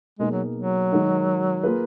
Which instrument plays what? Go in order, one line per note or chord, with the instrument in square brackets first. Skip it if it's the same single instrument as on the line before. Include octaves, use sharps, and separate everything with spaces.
[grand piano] B2 A#3 D#4 G#4 [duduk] G#3
[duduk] F#3
F#3
[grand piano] D#3 G#3 D#4 F#4 A#4
A#3 F4 G#4 B4